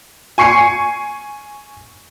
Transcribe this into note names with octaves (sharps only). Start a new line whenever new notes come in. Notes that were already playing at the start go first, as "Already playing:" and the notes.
G#5 C#6 C7 C#7